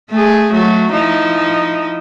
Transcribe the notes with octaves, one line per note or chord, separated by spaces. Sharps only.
A3 G#4
F#3 A3 F#4
F3 D#4 E4